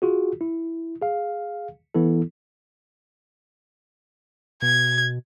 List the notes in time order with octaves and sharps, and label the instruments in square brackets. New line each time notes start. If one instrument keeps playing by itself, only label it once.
[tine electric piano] F4 F#4 G#4
E4
G#4 F5
E3 B3 E4 A4
[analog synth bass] B2 [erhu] G#6